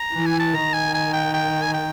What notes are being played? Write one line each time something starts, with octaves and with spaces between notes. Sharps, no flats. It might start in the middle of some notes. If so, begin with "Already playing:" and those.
Already playing: A#5
E3
G#5
A5
D#3 A#5
G#5
G#5
G5
G5
G#5
G5